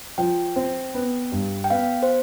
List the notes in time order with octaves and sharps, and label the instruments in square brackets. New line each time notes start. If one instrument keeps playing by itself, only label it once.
[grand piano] F3 [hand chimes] G5
[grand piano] C4
B3
G2
[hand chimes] G5
[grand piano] B3 [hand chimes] F5
[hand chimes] C5